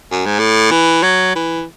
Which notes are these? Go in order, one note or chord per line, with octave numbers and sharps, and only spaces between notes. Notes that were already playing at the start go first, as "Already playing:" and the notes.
F#2
G#2
A2
E3
F#3
E3